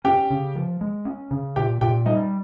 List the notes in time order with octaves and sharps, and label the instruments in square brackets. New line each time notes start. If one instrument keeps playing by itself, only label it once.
[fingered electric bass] C#4 [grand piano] G4 G5
[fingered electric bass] C#3
F3
G#3
C#4
C#3
[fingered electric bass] A#2 [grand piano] G4 G5
[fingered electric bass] A#2 [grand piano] G4 G5
[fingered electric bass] G3 [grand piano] D#4 D#5